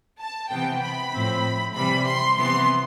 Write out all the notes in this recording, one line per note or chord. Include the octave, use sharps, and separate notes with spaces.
A5
C3 E3 B3 G5
B5
A2 F3 C4
C3 E3 G3 B5
C6
C3 E3 B3 C6